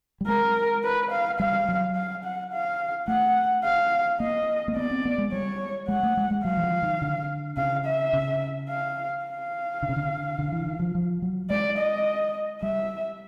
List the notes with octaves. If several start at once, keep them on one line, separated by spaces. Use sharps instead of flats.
G3
G#3 A#4
B4
F5
G3 F5
F#3
F5
F#5
F5
A3 F#5
F5
A#3 D#5
A#3
B3 D5
C4
B3
G#3
G3 C#5
G#3 F#5
A3
G#3
G#3
F#3 F5
E3
F3
D#3
D3
C#3 F5
E5
C#3
F5
F5
D3
C#3
D3
D3
E3
D#3
F3
F3
F#3
G#3 D5
D#5
G3 E5